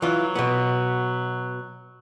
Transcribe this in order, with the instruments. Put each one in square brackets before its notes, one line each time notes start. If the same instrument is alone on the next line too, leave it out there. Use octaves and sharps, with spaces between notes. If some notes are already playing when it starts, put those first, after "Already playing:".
[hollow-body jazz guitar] E3 F4 [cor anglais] F#3
[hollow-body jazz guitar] B2 B3